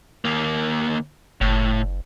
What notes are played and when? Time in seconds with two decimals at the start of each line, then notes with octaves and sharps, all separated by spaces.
0.25 D#2 A#3
1.41 F#1 A2